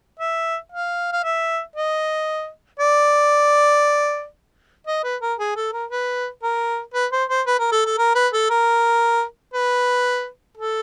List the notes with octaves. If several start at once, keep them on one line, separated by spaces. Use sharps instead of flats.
E5
F5
F5
E5
D#5
D5
D#5
B4
A#4
G#4
A4
A#4
B4
A#4
B4
C5
C5
B4
A#4
A4
A4
A#4
B4
A4
A#4
B4
A4